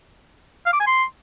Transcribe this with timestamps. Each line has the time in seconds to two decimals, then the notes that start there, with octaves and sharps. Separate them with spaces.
0.66 F5
0.73 D6
0.80 G#5
0.87 C6